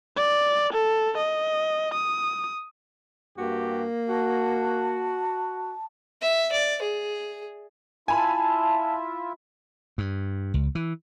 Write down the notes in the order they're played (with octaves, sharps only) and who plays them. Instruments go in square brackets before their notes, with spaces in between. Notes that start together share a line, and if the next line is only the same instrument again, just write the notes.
[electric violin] D5
A4
D#5
D#6
[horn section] G2 F#4 G4 [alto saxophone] A#3
[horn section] F#4 [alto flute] A5
[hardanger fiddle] E5
D5
G#4
[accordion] E4 F4 E5 [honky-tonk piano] G#5 B5 [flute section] A5
[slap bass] G2
C#2
E3